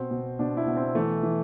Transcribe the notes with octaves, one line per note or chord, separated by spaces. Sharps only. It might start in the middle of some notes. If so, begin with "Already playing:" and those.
Already playing: B2 C4
B2
B2 D4
E4
B2
C4
E3 A3
E3